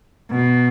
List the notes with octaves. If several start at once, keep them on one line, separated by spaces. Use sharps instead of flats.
B2